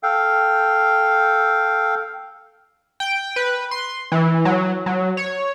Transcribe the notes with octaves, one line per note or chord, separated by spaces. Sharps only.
A4 F5 G5
G5
B4
C6
E3
F#3
F#3
C#5